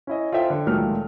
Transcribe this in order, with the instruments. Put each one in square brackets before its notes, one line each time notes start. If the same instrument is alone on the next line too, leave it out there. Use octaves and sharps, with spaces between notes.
[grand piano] C#4 E4 D#5
F4 A4 C5 E5 G5
D3
C#2 A#2 D#3 F#3 A3 F6